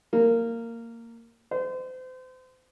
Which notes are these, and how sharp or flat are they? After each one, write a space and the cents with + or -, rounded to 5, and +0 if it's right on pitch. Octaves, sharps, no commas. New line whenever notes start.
A#3 -15
C5 -35